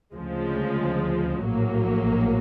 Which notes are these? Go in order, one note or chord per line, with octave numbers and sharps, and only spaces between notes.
D2 C#3 F3 G#3
A#1 A2 F#3 A#3